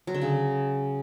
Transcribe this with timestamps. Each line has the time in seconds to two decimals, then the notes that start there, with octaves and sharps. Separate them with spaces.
0.07 F#3
0.14 D3
0.22 C#3